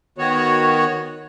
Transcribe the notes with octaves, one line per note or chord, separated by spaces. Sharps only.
D#3 B3 F#4 C#5